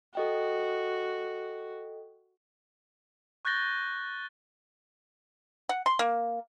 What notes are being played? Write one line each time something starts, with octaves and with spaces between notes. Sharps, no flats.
F#4 A4 D#5 G5
C#6 F#6 G6 A6 A#6 G7
F#5
C6
A#3